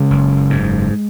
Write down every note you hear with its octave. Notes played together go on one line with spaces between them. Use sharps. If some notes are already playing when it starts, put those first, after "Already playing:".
Already playing: C#3 G#3
F#1
G#2